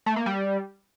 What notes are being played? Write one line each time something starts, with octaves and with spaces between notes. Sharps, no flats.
A3
A#3
G3